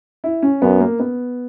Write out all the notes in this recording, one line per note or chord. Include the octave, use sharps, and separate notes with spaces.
E4
C#4
F#2 B3
A#3
B3